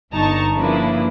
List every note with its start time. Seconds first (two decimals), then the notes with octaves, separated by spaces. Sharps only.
0.13 G1 G2 D#4 A5 A#5 C#6
0.56 C#3 F3 A#3 D4 E4 B4